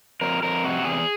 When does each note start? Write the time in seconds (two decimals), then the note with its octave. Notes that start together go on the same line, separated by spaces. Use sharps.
0.21 F2 A#4
0.43 F2 A#4
0.64 C3 F#4
0.85 E2 G#4